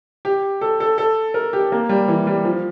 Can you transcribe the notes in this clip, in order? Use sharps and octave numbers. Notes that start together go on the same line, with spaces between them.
G4
A4
A4
A4
A#4
G4
A#3
G3
E3
G3
F3